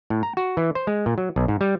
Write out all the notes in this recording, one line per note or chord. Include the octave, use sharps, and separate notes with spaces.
A2
A#5
F#4
E3
C5
G#3
A#2
F#3
B1
G#2
G3